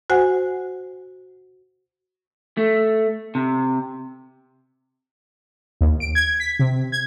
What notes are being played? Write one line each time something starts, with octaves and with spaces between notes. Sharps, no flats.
F#4 C5 F#5 G#5
A3
C3
D#2
D7
G#6
B6
C3
G#6